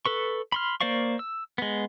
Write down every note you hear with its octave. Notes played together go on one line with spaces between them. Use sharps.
A4 B4 C#6
B5 C6 F6
A#3 C5 D5 F5 C#6
E6
G#3 B3